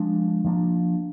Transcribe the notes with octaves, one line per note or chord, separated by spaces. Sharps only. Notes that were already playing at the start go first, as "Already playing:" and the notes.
Already playing: F3 G#3 D4
F3 A#3 D4